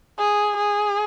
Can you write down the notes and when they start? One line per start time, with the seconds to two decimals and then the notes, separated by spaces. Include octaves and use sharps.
0.18 G#4
0.57 G#4